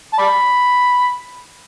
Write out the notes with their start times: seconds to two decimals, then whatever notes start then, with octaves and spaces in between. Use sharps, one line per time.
0.13 A5
0.18 D5 B5